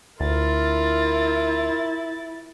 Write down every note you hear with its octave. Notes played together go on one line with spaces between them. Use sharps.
D2 E4 F4 A#4 A6